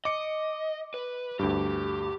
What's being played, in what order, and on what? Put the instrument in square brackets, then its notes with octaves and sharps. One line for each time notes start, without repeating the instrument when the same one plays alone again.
[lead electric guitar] D#5 [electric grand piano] D6 C#7
[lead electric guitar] B4
[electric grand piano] D2 G2 [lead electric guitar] G4